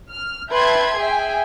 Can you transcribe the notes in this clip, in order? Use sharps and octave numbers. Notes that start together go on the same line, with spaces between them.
F6
B4 E5 G5 A5 C6 G#6
G#4 E5 G5 G#5